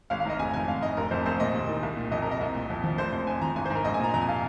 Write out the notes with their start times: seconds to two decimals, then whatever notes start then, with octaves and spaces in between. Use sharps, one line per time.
0.10 G#1 F5
0.20 F5
0.25 G#2 D#5
0.39 F1 G#5
0.53 F2 G#5
0.68 G#1 F5
0.82 G#2 D#5
0.97 F1 A#4
1.11 F2 C5
1.26 A#1 C5
1.40 A#2 D#5
1.54 D#2
1.69 D#3
1.83 C2
1.97 A#2
2.12 F2 D#5
2.22 A#4
2.26 C3 D#5
2.41 C2
2.55 A#2
2.70 F2
2.84 F3
2.98 F1 C5
3.12 F2 C5
3.27 F2 G#5
3.41 F3 A#5
3.56 G#1 G#5
3.65 C5
3.70 G#2
3.75 A#4
3.85 A#1 D#5
3.94 G#5
4.00 A#2 A#5
4.14 F2 A#5
4.21 G#5
4.28 C3 F5